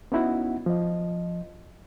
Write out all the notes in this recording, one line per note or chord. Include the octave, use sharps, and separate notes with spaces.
B3 C#4 D#4 E4 F#4 F#5
F3 D#5